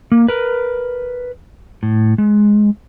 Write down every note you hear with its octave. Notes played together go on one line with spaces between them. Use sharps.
A#3
A#4 B4
A2
G#3